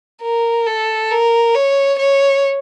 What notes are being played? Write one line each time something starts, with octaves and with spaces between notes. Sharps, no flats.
A#4
A4
A#4
C#5
C#5